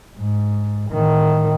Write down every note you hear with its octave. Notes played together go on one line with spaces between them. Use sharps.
G#2
A2 D#3